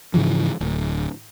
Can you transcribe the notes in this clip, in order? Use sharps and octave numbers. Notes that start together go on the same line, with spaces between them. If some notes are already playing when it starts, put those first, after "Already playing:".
G#2 C#3 E3 F3
D1